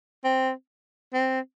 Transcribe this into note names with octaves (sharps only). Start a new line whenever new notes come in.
C4
C4